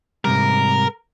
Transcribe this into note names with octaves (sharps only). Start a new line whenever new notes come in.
G#2 C3 G3 A#4